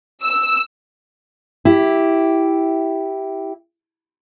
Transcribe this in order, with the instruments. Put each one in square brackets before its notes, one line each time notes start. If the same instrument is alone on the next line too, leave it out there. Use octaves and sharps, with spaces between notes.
[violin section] E6
[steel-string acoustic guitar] E4 G4